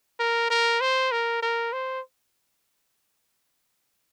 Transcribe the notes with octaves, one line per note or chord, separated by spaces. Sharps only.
A#4
A#4
C5
A#4
A#4
C5